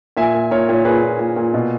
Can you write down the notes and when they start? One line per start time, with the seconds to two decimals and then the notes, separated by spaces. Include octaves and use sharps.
0.17 A#2 E5 G#5
0.35 A#2
0.51 A#2 A#4 C#5
0.69 A#2
0.74 C#5
0.85 A#2 G#4 B4
1.02 A#2
1.19 A#2
1.36 A#2
1.54 B2